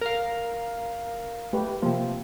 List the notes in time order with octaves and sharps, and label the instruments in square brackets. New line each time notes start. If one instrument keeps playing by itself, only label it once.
[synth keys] A#4 F5
[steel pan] A3 G4 B4
[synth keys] C3 F3 [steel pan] A#3